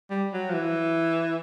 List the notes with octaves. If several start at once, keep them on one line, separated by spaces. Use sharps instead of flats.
G3
F#3
F3
E3